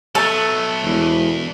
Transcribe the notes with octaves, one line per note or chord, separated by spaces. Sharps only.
F#3 A3 B3 A4 C#5
E1 E2